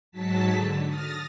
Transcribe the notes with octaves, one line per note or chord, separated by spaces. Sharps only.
G#2 F#3 A5 B6
D3
D#6 F6 A6 A#6